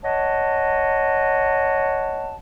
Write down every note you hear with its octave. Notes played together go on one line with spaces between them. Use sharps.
C#5 D#5 F#5 A5